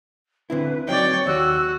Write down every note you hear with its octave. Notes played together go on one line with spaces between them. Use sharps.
D3 C4 E4 B4
F#3 C4 D#4 C#5 D5 G5
D#2 F#4 E6